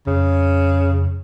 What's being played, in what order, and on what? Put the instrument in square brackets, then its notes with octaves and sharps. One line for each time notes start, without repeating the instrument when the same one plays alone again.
[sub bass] F2 [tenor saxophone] C#3